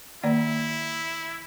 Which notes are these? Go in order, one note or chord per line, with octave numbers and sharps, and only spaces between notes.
D#3 A#3 E4 D5